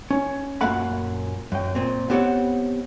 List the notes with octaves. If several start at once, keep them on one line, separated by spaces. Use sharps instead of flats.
C#4
F#2 A#2 A#3 F5 F#5 B5
F#2 G5
A#2 C4
B3 C4 G4 C#5 D#5 F#5